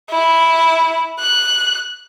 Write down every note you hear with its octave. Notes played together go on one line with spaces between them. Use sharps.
E4
F#6